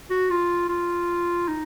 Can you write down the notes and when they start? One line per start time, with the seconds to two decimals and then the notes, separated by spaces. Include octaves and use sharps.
0.10 F#4
0.30 F4
0.69 F4
1.48 D#4